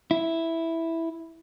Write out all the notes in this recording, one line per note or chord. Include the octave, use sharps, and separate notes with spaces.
E4